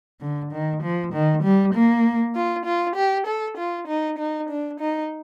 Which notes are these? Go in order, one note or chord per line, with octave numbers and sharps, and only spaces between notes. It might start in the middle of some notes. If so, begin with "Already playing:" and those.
D3
D#3
F3
D#3
G3
A#3
F4
F4
G4
A4
F4
D#4
D#4
D4
D#4